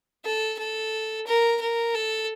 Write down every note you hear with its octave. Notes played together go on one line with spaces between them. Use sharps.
A4
A4
A#4
A#4
A4